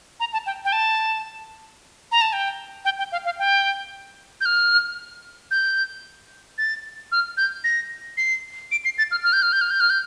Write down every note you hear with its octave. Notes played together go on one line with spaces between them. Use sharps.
A#5
A5
G5
G5
A5
A#5
A5
G5
G5
G5
F5
F5
G5
G6
F6
G6
A6
F6
G6
A#6
C7
D7
C7
A6
F6
F6
G6
F6
G6
F6
G6
F6
G6